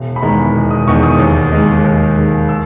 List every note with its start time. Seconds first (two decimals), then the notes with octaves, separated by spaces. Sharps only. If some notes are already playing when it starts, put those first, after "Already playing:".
Already playing: E1
0.16 B5
0.22 E2 D#3 G#3 A#5
0.55 E1
0.71 D#6
0.87 E2 D#3 G#3 C#6
1.03 D#6
1.19 D#2
1.52 D#3 G#3
1.84 D#2
2.17 D#3 G#3
2.49 E6